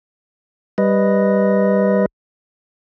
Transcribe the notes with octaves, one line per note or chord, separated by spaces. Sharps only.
G3 B4 D#5